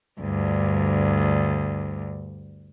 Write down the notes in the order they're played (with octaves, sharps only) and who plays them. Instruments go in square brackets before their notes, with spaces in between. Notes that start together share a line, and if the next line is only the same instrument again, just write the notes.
[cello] D2 G2